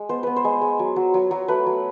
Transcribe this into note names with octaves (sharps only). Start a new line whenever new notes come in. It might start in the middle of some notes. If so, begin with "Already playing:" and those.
Already playing: G#3
B3 C5
B3 B4
C5
G#3
G#3
F#3
F#3
F#3
F#3
A3 B4
F#3